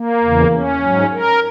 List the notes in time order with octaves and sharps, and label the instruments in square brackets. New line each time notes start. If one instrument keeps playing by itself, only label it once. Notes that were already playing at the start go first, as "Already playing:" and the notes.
Already playing: [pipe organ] A#3
E2 C#3 E3
C#4
G#2 F#3
A#4